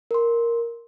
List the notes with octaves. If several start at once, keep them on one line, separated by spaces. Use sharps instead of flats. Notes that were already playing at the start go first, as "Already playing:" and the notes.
A#4 C6